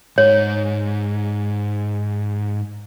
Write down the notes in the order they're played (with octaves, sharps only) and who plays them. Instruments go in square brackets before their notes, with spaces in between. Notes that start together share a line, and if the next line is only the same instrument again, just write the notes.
[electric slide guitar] G#2 [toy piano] C#5